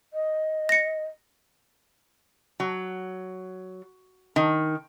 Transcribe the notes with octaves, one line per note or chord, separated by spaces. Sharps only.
D#5
A#6 C#7
F#3
D#3